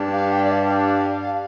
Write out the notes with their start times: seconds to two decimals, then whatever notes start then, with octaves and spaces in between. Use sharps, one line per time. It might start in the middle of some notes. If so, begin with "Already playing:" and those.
Already playing: G2 G3 D4
0.13 F5
0.32 G5
0.45 D5
0.52 F5